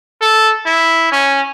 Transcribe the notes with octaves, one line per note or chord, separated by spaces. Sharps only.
A4
E4
C#4